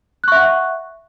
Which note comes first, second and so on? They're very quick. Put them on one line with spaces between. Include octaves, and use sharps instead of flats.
F#6 C#6 E5 F#5